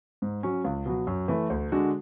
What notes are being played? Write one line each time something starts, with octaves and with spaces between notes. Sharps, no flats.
G#2
F#3 C#4
C#2
B2 F#3
F#2
E3 A3
D2
D3 G#3 D4 F#4